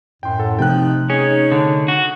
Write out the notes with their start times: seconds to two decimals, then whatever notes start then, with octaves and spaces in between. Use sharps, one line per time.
0.23 F#2 A2 G5 C6
0.39 A4 F#5
0.59 C3 F3 A3 D#4 G5 F#6
1.10 C#4 D#4 G#4 C#5
1.52 D3
1.88 F#4